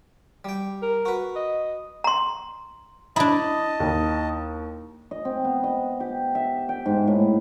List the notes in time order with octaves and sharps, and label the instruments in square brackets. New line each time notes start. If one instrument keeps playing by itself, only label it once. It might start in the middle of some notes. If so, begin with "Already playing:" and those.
[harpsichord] G3 G5
[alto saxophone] A#4
[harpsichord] F#4 B4
[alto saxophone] D#5
[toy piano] A#5 C6
[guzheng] D4 E4 [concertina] D#5 A5 [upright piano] B5
[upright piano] D#2
[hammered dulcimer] D#5
C4
B3
D#5
G4
E5
G5
G#2
A2